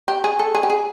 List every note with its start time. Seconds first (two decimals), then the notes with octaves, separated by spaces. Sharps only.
0.08 G4
0.24 G#4
0.39 A4
0.55 G#4
0.63 G4
0.70 G#4